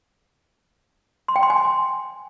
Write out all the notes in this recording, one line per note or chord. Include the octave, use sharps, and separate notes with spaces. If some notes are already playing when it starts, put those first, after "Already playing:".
C6
G5
C6
G#5
C6